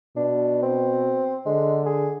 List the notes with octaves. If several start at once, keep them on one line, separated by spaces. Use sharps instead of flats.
B2 D4
C4
D3 G#3
G#4